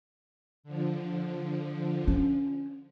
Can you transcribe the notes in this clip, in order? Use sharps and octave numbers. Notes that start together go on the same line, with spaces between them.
D3 F3
C#4